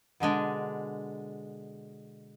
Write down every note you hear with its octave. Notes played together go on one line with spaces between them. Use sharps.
B2 D3 G#3 D4